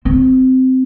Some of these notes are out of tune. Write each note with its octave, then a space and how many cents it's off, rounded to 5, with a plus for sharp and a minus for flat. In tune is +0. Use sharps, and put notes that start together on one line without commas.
C4 -15